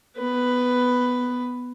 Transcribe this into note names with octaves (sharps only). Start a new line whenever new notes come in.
B3 B4